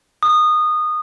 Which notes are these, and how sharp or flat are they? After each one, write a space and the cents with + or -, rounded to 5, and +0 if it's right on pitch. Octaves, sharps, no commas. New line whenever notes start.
D#6 -20